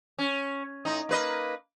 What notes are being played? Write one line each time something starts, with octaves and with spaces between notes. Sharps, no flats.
C#4
A2 D#4
A#3 B4 D#5